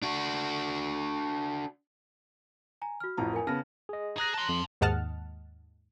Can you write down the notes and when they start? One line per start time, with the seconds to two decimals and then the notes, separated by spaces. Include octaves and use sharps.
0.02 D4 F#4
2.82 G#5 A#5
3.00 F#4 F6
3.17 A1 F2 A#5
3.33 A#4 G#5
3.47 C#3 B3 A5 F6 A#6
3.89 G#4 D#5
4.18 G#4 A#5 F#6 A#6
4.34 A5 C6
4.49 F2
4.81 D#2 G#2 D#5 F#5 A5 F6